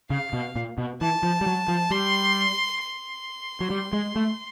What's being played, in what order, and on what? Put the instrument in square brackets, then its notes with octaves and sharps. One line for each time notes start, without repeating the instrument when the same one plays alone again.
[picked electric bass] C#3 [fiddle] F5
[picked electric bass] B2
A#2
B2
[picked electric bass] E3 [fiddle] A5
[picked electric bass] F3
G3
F#3
F3
[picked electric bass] G3 [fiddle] C6
[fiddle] C6
[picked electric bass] F#3
G3
G#3
A3